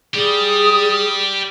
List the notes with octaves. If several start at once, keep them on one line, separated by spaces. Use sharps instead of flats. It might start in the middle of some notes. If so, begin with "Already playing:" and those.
G4 G#4 D5